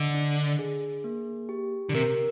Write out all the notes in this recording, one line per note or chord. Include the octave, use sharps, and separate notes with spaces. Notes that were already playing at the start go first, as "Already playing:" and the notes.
Already playing: D3 D#5
D4
G#4
A#3
G4
D3
C3 A#4